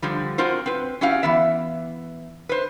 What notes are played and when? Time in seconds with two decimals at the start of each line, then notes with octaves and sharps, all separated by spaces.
0.02 D3 F3 G3
0.38 C4 F4 F#4 A#4 C5
0.66 C4 B4
1.01 C#4 E4 F#4 G4 F5
1.23 E3 B3 E5
2.49 B4 C5